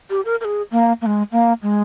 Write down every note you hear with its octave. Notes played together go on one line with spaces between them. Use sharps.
G4
A#4
A#4
G#4
A#3
A#3
G#3
A#3
G#3